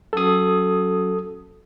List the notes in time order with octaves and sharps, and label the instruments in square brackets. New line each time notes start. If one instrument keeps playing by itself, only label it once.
[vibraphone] F#3 C#4 F#4 [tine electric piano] A4 D#6